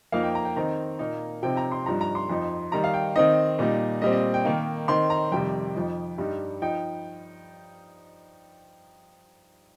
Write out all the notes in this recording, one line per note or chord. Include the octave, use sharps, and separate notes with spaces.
F2 F3 A#3 D#4 F5
G5
A#5
G5
D#3 C4 D#4 A#5
A#2 A#3 D#4
C3 F3 C4 D#4 G5
A#5
C6
G2 F3 D#4 A#5
A#5
C6
F2 F3 D#4
D#3 G3 D#4 A#5
F5
G5
D#3 C4 D#4 D#5
A#2 G3 D#4
A#2 G3 C4 D#5
D#5
G5
D#3 A#3 D#4
D#3 C4 D#4 C6
A#5
F2 C3 D#3 G3 G5
F2 F3 D#4
G2 G3 D#4
F3 D#4 G5